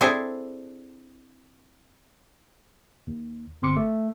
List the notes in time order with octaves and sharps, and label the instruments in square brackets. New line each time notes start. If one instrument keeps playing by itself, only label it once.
[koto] C4 D4 E4 G#4 A4
[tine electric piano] D#2
G1 C4 C6 D6 C#7
A3